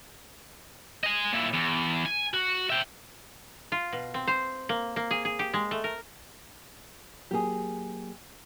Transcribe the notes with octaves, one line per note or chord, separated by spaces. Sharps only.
D#5 G#5
A#2 E4
E2
G#5
F#4
E5 G5
F4
B2
C4
C5
A#3
A#3
G#4
G#4
G4
G#3
A3
A#4
F#3 A#3 G4 G#4